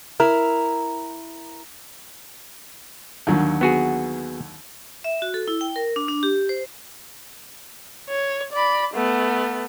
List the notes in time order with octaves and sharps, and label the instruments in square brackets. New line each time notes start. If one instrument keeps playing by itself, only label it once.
[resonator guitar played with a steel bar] E4 A#4
[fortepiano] D#2 D3 F#3
[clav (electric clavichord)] B3 F#4 G#4
[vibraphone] E5
F#4
A4
E4
G5
A#4
D4
D4
G4
C5
[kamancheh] C#5
D5 B5
A3 B3